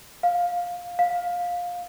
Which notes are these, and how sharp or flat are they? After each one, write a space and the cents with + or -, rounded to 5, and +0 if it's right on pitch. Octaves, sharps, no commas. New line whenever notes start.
F5 +10
F5 +15